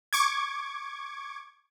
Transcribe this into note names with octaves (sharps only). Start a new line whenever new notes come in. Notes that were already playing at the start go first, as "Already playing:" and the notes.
C#6 D6 G#6